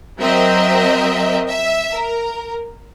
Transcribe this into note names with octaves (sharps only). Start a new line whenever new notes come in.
F#3 C4 A#4 D#5 E5
E5
A#4